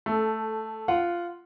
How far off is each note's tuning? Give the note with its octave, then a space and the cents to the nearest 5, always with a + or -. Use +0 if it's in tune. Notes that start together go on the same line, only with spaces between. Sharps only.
A3 +0 A4 -15
F4 -10 F#5 +0